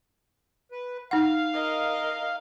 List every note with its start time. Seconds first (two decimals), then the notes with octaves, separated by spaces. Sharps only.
0.72 B4
1.11 D#4 F5 F#5
1.54 A#4 D#5